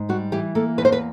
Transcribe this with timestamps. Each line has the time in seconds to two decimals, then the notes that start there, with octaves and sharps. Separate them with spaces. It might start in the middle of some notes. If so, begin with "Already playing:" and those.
Already playing: G#2
0.09 G3 F#4
0.32 E3 G4
0.55 A#3 A4
0.78 E2 B4
0.85 C5
0.92 B4